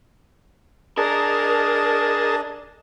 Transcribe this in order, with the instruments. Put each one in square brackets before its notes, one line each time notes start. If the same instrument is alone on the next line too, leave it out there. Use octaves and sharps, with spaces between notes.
[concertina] D4 [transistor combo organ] G#4 D#5 A5 [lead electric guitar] A#4